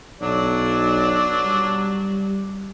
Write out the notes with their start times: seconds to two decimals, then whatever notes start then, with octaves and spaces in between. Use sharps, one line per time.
0.21 B1 F#3 D4 D5
1.44 G3